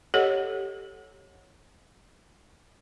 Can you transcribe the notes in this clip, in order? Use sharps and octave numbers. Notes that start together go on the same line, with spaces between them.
G4 A4 C#5 D#5 F#5